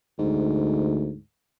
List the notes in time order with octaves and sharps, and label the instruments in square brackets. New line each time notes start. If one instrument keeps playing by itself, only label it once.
[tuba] D2 [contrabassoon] G#2